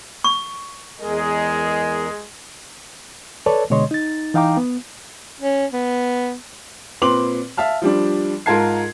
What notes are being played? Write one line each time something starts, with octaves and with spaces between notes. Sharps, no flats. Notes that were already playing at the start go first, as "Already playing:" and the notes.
C#6
E2 G#3 G#4 A#4 D#5
A4 B4 C#5 D5 A5
B2 D3 G#3 C#5 D#5 C6
D#4 A6
E3 D#4 F5 G5 A#5 D6
B3
C#4
B3
A#2 C4 B4 C6 D6 F#7
E5 F5 A5 F6
F3 G3 D4
G#2 F4 A#4 A5 G#6 C7